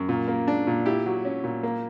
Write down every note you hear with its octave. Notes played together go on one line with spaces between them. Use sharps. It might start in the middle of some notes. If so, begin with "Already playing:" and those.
Already playing: F#2
A#2
A#3
D4
A#2
E4 G4
F#3
C#4
A#2
A#3